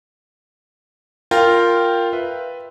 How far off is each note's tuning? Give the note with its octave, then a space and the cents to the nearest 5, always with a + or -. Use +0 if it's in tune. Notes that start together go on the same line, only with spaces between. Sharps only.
F4 +0 A#4 -10 G5 +0
B4 +0 E5 +0